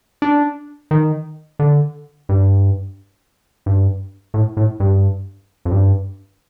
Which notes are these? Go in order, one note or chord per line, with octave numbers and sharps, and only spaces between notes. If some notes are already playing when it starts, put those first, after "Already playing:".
D4
D#3
D3
G2
G2
A2
A2
G2
F2
G2